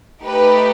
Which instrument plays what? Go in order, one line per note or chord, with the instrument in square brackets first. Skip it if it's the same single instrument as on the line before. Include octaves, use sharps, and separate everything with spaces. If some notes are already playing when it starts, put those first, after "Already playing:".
[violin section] A3 D#4 G4 B4